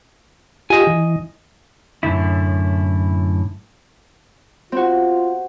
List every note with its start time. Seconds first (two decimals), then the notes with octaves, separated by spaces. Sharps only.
0.70 F4 G4 D#5 G#5
0.87 E3
2.03 F#2 A2 D3 E4
4.72 C4 F4 F#4